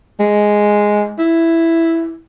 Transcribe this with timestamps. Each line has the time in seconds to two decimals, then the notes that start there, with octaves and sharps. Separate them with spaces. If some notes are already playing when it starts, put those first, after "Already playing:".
0.20 G#3
1.18 E4